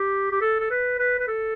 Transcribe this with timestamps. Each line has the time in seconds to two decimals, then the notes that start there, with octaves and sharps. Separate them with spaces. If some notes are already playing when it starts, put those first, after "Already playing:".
Already playing: G4
0.31 G4
0.41 A4
0.60 A4
0.70 B4
0.99 B4
1.19 B4
1.27 A4